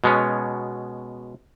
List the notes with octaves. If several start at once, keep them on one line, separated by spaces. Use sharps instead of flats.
B2 G#3 B3 C#4